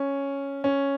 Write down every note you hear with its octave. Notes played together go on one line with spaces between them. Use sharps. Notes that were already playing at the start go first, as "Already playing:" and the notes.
Already playing: C#4
C#4